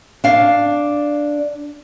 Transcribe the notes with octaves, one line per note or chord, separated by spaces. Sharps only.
D4 F5